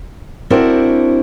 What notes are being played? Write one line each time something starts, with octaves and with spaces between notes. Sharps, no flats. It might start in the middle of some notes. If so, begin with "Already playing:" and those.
C4 D4 E4 F#4 A#4 C5